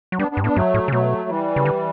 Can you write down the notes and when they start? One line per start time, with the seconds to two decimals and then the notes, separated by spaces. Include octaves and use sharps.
0.12 F#3
0.19 G3 B3 D4
0.31 B3 D4
0.37 G2
0.44 A2 B3 D4
0.55 G2 F#3 A3
0.74 A2
0.88 C#3
0.92 B2 F#3 A3
1.29 E3 G3
1.56 C#3
1.65 D3